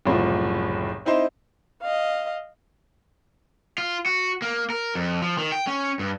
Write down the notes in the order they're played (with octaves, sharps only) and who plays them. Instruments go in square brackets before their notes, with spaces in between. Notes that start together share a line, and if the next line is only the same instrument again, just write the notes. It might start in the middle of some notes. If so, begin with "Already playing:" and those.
[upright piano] F#1 C2 A2 F3
C4 D#4 E4 C5
[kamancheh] D#5 F5
[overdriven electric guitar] F4
F#4
A#3
A#4
F2
F3
D#3
G5
C#4
G2